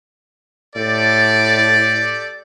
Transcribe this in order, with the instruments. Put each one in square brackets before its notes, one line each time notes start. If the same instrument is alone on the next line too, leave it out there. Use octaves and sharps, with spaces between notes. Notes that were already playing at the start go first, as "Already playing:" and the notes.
[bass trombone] A2 [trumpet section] G4 A4 D5